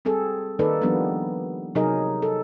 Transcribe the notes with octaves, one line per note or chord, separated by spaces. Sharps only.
G3 C4 G#4 A4
D#3 A#3 D#4 A4 B4 D5
F3 G3 A#3 B3 D4
C3 F#3 D#4 G#4 A#4 D#5
A4